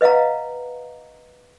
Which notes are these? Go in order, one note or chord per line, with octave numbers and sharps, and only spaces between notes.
B4 D#5 F5 F#5 A#5